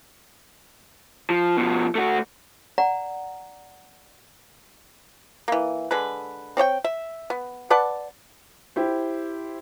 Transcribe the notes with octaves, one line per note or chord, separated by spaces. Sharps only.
F3
B2 F3
A3 F#4
D5 F#5 A#5
E3 A#3
D3 G#3 B4
C4 C#5 D5 G5
E5
B3
B4 D5 F#5 A5
E4 G4 C5